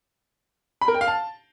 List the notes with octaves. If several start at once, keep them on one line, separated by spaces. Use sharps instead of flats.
B5
A#4
G5
F5
A5